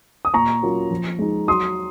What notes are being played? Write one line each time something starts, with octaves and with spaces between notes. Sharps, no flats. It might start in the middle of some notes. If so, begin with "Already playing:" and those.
D#6
A#2 A#5 C#6
F#3 A#3 C#4 F4
F3
G#3 D#4
F#3 C6 D#6